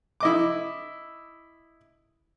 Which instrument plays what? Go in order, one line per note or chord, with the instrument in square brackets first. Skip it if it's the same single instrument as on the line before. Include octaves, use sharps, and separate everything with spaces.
[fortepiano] E4 D#5 D6